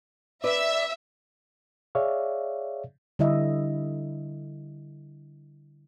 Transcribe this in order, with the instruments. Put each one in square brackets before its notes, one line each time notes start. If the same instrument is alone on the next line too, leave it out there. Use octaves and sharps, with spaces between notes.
[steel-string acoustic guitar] B4 D5 [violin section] E5
[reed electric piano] G#4 C#5 D5 E5 F5
[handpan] D3 G3 E4 D#5 E5